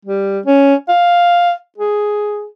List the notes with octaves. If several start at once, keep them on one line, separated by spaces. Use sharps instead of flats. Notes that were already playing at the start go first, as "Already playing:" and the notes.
G3
C#4
F5
G#4